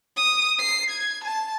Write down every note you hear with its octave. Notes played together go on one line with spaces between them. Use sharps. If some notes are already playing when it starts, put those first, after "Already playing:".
D#6
C7
G#6
A5